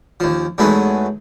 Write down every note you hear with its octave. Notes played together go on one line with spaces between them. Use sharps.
D#2 F3
E2 F#3 G#3 A3 B3 D#4